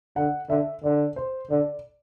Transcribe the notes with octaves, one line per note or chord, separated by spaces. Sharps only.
D3 F#5
D3 E5
D3 D5
C5
D3 D5